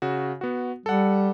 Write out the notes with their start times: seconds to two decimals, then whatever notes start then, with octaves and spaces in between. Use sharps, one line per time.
0.02 C#3 F#4
0.41 B3 F#4
0.86 G3 A4 F#5